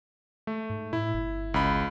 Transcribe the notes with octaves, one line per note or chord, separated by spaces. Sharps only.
A3
G#2
A2 E4
G1
C#2 B5